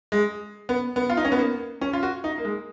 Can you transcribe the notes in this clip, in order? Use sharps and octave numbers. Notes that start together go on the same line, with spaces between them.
G#3
B3
B3
F4
D#4
C#4
B3
A#3
C#4
F4
F#4
D#4
A#3
G#3